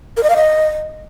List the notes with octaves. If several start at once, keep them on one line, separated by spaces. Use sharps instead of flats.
A#4
D#5
F5
D#5